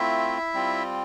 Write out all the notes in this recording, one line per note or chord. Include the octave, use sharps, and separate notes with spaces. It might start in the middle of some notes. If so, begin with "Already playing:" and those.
Already playing: A3 C4 E4 F4 E5
G3 C4 F4